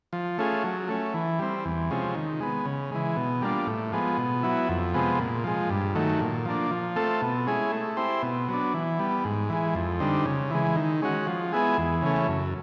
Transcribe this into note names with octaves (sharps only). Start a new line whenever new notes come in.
F3
A3 C#4 F4 G#4
F#3
A3 C#4
E3
G3 C4
E2
C3 F3 G#3 C#4
D#3
G#3 B3
C#3
E3 G#3
B2
G3 A#3 D4 F4
A2
F3 G#3 B3
B2
F#3 B3 E4
F2
C3 F3 G#3 B3
A#2
F3 G#3
G2
D#3 F#3 A3
A#2
F3 A#3 D4
F3
A3 C4 F4 A4
B2
G#3 C#4 E4 G#4
A3
C4 E4 G4 C5
B2
F#3 B3 D4
E3
G3 B3
G#2
E3 G#3
F2
D3 G3 C4 D#4
C#3
E3 G#3
D#3
G#3 C#4 F#4
F3
G#3 B3 E4 G#4
E2
C#3 E3 A3 C#4
F#2